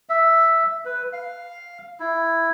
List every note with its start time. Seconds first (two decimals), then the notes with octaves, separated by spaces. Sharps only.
0.09 E5
0.85 B4
1.13 F5
2.00 E4